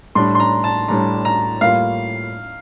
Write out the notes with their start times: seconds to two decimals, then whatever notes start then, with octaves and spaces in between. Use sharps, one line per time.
0.15 A2 G3 D4 C6
0.35 C6
0.40 A#5
0.64 A5
0.88 A2 G3 D4 A#5
1.25 A#5
1.61 A2 G3 A#3 F4 F5